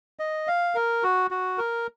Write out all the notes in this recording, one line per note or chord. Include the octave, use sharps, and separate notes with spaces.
D#5
F5
A#4
F#4
F#4
A#4